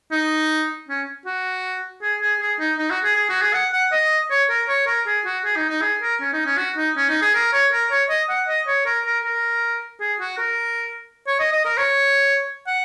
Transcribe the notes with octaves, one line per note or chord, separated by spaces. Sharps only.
D#4
C#4
F#4
G#4
G#4
G#4
D#4
D#4
F#4
G#4
G#4
F#4
G#4
F#5
F#5
D#5
C#5
A#4
C#5
A#4
G#4
F#4
G#4
D#4
D#4
G#4
A#4
C#4
D#4
C#4
F#4
D#4
C#4
D#4
G#4
A#4
C#5
A#4
C#5
D#5
F#5
D#5
C#5
A#4
A#4
A#4
G#4
F#4
A#4
C#5
D#5
D#5
A#4
C#5
F#5